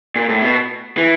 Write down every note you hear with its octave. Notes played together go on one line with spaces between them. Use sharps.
A#2
A2
B2
E3